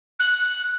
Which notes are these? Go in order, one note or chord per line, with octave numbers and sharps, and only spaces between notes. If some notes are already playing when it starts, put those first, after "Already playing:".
F#6